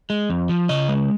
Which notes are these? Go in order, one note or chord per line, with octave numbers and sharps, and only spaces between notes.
G#3
F2
F3
C#3 D#5
G#3